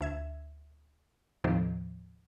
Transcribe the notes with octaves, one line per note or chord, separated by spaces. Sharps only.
D2 E5 G#6
D#2 A2 C3 D#3 F3